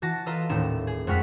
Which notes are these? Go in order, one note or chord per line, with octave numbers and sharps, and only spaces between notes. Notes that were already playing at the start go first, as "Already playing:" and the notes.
E3 F#4 A5 A#6
F4 A4 B4 D#5 A#5 E6
D#1 A2 D#4 E7
G#4
F2 G#3 F#5 C#6 F6 B6